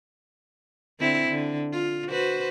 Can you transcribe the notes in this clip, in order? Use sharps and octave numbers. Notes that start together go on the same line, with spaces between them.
D3 C4 E4
D3
F4
F#4 B4 C5